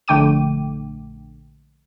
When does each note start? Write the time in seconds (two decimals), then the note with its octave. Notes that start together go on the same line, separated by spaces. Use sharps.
0.08 A#1 D3 A3 G5 D6 D#7